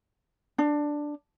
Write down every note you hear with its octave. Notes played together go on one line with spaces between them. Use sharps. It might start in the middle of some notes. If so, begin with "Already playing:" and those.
D4